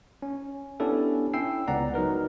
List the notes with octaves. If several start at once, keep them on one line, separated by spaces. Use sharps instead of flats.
C#4
B3 C#4 D4 E4 G4 A4
C#4 E4 G5 E6 C7
C#2 B3 D5 F#5 A#5
F#3 D#4 A#4 B4